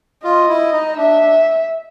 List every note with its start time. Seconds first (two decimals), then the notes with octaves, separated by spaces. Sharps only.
0.24 F4 D#5
0.49 E4
0.73 D#4
0.97 D4 E5
1.22 D4